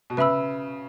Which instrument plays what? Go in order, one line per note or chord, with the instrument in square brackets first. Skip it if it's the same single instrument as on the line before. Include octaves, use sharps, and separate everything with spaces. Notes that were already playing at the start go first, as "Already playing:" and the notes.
[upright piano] B2
[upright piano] C#3 [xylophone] B4 E5 B5 E6